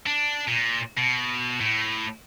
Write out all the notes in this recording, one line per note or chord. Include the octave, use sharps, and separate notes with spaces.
D4
A#2
B2
A2